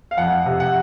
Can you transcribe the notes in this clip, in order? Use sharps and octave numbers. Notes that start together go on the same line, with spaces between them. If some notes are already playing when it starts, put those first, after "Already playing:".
F5
F2 F#5
C3
F#5